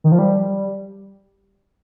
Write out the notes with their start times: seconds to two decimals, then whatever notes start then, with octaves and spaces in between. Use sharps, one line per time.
0.04 D#3
0.12 F3
0.19 G3